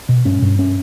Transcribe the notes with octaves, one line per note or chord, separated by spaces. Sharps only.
B2
G2 C#4
G2
C#4